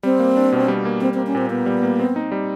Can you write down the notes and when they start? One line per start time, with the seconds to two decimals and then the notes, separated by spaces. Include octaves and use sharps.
0.03 G3 C4
0.19 A#3
0.37 D4
0.52 B2
0.68 G3
0.85 A#3
1.01 G3 C4
1.14 C4
1.18 A#3
1.27 C#4
1.35 A#2 C4
1.50 A#2 B3
1.66 G3
1.83 A#3
2.00 C4
2.16 D#4
2.32 G3